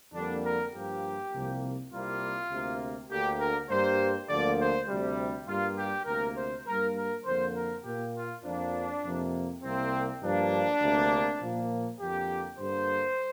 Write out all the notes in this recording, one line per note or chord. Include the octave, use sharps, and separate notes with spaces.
F2 D3 G3 A#3 D4
A#4
G2 F3 A#3 G4
C2 C3 F3 A#3
C2 C3 G3 A#3 F4
D2 C3 A#3
D2 D3 A#3 G4
A#4
G2 G3 A#3 C5
D2 D3 F3 A#3 D5
C5
D2 C3 G3
G2 G3 A#3 F4
G4
D2 C3 A#3 A#4
C5
G2 G3 A#3 A#4
A#4
F2 D3 A#3 C5
A#4
A#2 A#3 G4
F4
F2 F3 A#3 D4
F2 C3 A#3
C2 C3 A#3 C4
G2 F3 A#3 D4
D2 C3 A#3
A#2 F3 A#3
F2 D3 A#3 G4
G2 D3 A#3 C5